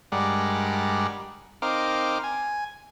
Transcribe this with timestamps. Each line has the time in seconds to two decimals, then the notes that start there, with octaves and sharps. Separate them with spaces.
0.12 G2 G3 G#3 A#4 D5 F#5
1.62 C4 D#4 A#4 F5 D6
2.23 G#5